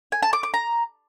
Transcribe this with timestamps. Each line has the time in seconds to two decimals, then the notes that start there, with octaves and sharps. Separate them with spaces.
0.12 G#5
0.23 A5
0.33 D6
0.43 D6
0.54 A#5